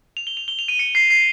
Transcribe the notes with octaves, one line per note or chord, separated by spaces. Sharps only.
F7
G7
F7
G7
F7
D#7
C#7
C7
C7